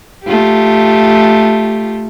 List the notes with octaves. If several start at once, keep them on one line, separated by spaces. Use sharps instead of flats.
A3 F4 G4